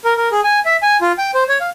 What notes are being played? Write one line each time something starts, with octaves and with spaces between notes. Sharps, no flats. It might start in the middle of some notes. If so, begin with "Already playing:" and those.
A#4
A#4
G#4
G#5
E5
G#5
F4
G5
C5
C#5
F5